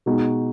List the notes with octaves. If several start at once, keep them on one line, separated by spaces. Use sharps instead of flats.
B2 G#3 D#4 F#4